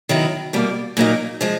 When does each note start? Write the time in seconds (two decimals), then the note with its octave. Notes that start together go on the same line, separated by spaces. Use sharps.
0.09 D#3 F#3 B3 E4
0.53 B2 G3 A#3
0.97 A#2 F#3 A#3 D#4
1.41 F3 G#3